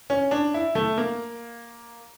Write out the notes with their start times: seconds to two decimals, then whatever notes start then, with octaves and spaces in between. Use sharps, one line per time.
0.10 C#4
0.31 D4
0.54 E4
0.75 A3
0.98 A#3